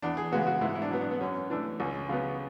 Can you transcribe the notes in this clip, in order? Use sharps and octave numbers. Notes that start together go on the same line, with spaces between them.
E2 D4
G#4
C#3 G#3 B3 F#4
F#4
G#2 E4
E4
D4
F#3 B3
D4
B3
F#2 C#4
E3 A3 D4
C#2 C#4
C#3 F#3 B3